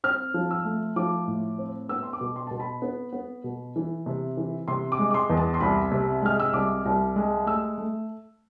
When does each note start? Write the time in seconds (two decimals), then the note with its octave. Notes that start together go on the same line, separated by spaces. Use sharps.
0.04 C4 F6
0.34 F3
0.51 E6
0.65 A3
0.96 F3 D6
1.28 A2
1.58 C4
1.89 B3 E6
2.03 C6
2.13 D6
2.21 B2
2.36 C6
2.47 B2 A5
2.60 B5
2.82 B3
3.13 B3
3.44 B2
3.76 E3
4.06 C3
4.37 E3
4.68 C3 C6
4.92 D6
4.99 G#3
5.11 D6
5.14 C6
5.30 E2
5.37 A5
5.54 C6
5.61 C2 B5
5.92 C3
6.22 G#3 F6
6.40 E6
6.53 C2 D6
6.85 C2
7.16 G#3
7.46 A3 E6
7.78 A3